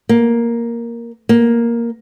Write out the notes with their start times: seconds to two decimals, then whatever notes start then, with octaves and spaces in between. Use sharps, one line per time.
0.09 A#3
1.29 A#3